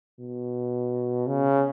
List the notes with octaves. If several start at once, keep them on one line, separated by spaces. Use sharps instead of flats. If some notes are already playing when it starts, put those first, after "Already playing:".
B2
C#3